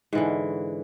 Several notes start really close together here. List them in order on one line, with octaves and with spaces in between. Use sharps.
G#2 E3 D3